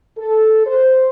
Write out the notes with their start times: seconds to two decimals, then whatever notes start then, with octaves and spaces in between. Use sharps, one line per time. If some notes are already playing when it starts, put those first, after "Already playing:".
0.17 A4
0.66 C5